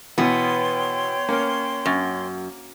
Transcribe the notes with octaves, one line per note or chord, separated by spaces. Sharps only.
B2 E3 B3 C#5 G5 C6
A#3 C#4
F#2